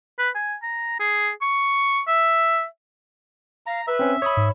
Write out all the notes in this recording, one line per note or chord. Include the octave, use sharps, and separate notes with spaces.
B4
G#5
A#5
G#4
C#6
E5
F5 A#5
B4 E5
C4 C#4
C#5 B5 D#6
G#2